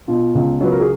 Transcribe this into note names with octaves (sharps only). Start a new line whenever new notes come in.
B2 F4
C#2
F#3 B4
A#4
G#4